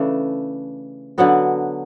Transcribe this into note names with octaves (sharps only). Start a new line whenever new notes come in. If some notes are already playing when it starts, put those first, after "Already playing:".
Already playing: C#3 E3 A3 D4
D3 F#3 B3 F#4